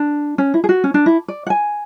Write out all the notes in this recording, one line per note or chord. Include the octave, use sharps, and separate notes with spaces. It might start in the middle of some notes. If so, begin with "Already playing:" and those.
Already playing: D4
C#4
E4
G#4
F#4
C#4
D4
E4
D5
F#5
G#5